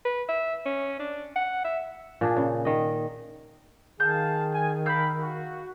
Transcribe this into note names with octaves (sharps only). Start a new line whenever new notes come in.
B4
E5
C#4
D4
F#5
E5
A#2 D4 G#4
C#3
D#3 D#5
D#3 G#4 F5 A5 G6
G#5
A#4 F5 B5 E6 G6
F#4